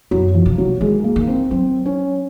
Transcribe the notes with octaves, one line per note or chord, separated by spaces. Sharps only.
F#2 F#3
F3
C3
F#3
D#3 G#3
A#3
D#3
C4
F#3 C4
C#4